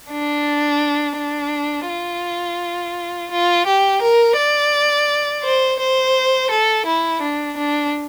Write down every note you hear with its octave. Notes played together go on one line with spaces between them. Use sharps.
D4
D4
F4
F4
G4
A#4
D5
C5
C5
A4
E4
D4
D4